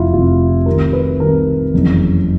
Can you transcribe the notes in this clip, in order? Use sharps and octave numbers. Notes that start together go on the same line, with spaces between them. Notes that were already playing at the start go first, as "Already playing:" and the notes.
Already playing: F1 F2 C3 E4 F4
F1 F2 C3 F4
C2 C3 D#3 A#4
B4
C2 C3 D#3 A#4
F#1 F2 C#3 E3